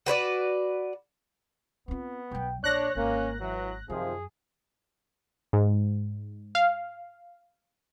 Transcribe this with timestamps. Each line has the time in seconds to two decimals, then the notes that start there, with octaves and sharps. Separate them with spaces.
0.06 F#4 B4 C#5 D5
1.88 B3 C4 F4
2.31 B1 F#3 G5
2.64 A#1 D4 C#5 F#6 A#6
2.95 G#1 A#3 C#4
3.40 E3 F#3
3.90 F#2 C3 D#3 F3 G#4
5.53 G#2
6.55 F5